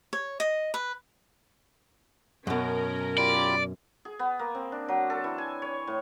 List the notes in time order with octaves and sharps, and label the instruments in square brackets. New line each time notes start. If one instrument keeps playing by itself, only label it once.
[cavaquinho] C#5
D#5
B4
[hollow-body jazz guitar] F#2 B2 [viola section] C#4 A#4
[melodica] F4 G4 B5 [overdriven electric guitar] D5
[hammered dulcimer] G#4
B3
A#3
C4
D4
F#3
A4
E3
G#5
C#5
A2